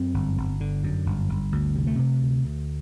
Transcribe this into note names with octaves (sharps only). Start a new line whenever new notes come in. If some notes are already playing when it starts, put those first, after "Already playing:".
Already playing: F#2 C4
G1
G1
D3
F#2
G1
G1
D2
C3
A3
C3
D2
D2